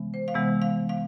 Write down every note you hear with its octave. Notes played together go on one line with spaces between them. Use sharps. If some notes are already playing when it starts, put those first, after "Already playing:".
Already playing: C3 E3 G#3 B3
C5
F5
C3 E3 G#3 B3 F#5
F5
F5